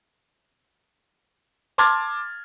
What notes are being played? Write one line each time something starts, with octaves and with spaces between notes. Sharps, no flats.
A5 C6 D6 F6 G#6 A6